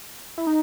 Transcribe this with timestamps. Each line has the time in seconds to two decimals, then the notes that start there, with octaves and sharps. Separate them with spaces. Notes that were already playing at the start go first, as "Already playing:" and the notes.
0.38 E4
0.47 D#4